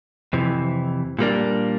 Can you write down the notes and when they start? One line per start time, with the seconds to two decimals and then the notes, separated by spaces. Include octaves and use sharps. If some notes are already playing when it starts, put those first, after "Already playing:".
0.33 F2 C3 E3
1.19 A#2 G3 A#3 D4